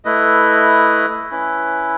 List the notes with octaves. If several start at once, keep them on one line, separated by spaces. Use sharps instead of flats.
A3 E4 B4 D#5
C#4 E4 B4